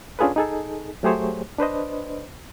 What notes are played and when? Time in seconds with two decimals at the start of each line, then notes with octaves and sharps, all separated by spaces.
0.19 C#4 D4 F4 G#4 A4 B4
0.36 D#4 G#4 A4
1.03 F#3 A3 G4 G#4 C5 C#5
1.59 D4 B4 C5 D#5